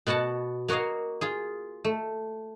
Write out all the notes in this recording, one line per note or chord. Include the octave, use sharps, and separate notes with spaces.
B2 B3 F#4 F#5 A5
A#3 F#4 C#5 D#5 F5
F4 G#4
A3